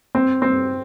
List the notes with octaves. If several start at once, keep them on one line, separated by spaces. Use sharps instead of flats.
C4
C4